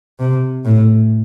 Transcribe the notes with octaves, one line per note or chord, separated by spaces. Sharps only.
C3
A2